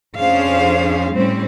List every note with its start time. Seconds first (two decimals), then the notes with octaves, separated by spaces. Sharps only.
0.17 F2 C#4 D4 G#4 C5 F5
1.14 A2 G3 C4 C#4 C5